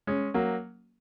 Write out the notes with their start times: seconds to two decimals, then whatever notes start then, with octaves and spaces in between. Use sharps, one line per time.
0.07 G#3 C#4
0.34 F#3 A#3